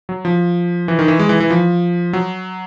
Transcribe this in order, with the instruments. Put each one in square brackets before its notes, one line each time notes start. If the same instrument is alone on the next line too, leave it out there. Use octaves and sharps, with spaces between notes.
[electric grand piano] F#3
F3
E3
D#3
E3
G#3
E3
E3
F3
F#3